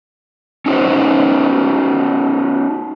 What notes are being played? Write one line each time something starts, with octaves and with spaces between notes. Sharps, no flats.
C#4 D#4 F#4 C5